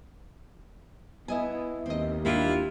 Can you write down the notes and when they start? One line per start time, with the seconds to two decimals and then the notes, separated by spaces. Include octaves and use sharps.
1.28 B3 E4 D#5 G#5
1.86 D#2 C4 D#5
2.25 A#3 D4 E4 F4 G4